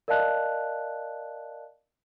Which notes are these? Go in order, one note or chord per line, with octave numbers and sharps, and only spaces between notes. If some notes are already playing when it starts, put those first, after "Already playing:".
A#4 D5 D#5 F5 A5 F#6